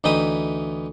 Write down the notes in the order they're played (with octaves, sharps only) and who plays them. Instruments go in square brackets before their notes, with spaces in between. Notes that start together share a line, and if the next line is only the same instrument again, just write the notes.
[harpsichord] D2 E3 D#4 G5 B5 D#6